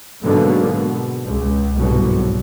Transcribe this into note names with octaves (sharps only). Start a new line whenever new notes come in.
G#2 B2 D3 F#3 G#3 A#3
B2
C#2
G1 C2 G#2 B2 F#3